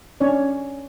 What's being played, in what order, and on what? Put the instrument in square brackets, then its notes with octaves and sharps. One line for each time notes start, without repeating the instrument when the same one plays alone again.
[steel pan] C#4 D4 C#5 D5